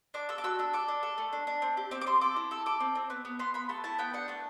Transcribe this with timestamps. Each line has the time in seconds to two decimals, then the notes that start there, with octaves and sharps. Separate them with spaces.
0.14 D4 D6
0.29 A4 E6
0.38 D6
0.44 F#4 E6
0.59 D4 E6
0.73 A4 D6
0.88 D4
1.03 A4
1.18 A3
1.33 D4
1.47 D4
1.62 C4
1.77 G4
1.91 C4 D6
2.01 D6
2.07 C4 C6
2.21 A4 D6
2.36 E4
2.51 A4 E6
2.66 A4 D6
2.80 C4
2.95 C4
3.10 B3
3.25 B3
3.39 B3 C6
3.54 B3 B5
3.69 A3 A5
3.84 E4 A5
3.98 B3 G5
4.13 D4 F#5
4.28 A3 A5